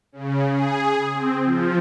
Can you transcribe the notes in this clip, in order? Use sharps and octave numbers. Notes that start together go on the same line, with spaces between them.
C#3
G#4
C4
F3